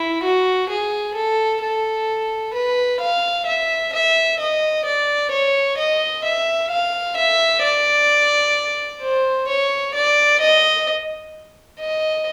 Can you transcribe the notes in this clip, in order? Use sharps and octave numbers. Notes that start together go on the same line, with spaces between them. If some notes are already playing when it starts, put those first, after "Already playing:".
Already playing: E4
F#4
G#4
A4
A4
B4
F5
E5
E5
D#5
D5
C#5
D#5
E5
F5
E5
D5
C5
C#5
D5
D#5
D#5